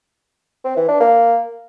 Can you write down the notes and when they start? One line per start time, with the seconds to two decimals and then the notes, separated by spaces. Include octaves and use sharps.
0.65 C4
0.76 E3
0.88 D4
1.00 A#3